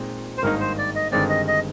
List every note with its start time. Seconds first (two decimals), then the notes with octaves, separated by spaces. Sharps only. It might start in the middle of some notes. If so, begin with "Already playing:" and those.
Already playing: A#2 G#3 C4 D#4
0.38 C5
0.43 G#1 G2 D#3 A#3 D#4 A#4
0.60 C5
0.78 D5
0.95 D#5
1.12 G1 G2 D#3 G#3 C4 D5
1.30 D#5
1.48 D#5